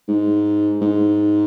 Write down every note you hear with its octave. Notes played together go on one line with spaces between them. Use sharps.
G#2
G#2